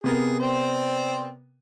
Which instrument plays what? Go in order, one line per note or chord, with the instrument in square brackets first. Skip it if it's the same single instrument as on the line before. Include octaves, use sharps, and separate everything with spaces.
[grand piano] C3 B3 A#4 [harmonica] G#4
[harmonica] C4 C5 D5